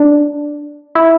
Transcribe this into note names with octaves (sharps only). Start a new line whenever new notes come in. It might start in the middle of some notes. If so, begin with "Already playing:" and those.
Already playing: D4
E4